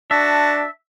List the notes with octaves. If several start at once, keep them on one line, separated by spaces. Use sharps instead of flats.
D4 F#4 E5 A5